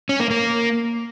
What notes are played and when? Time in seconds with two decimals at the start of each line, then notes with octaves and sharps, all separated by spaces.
0.09 C#4
0.20 A#3
0.30 A#3